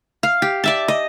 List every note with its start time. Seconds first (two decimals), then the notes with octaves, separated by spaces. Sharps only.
0.23 F5
0.42 G4
0.64 D5 E5 A5
0.88 D#5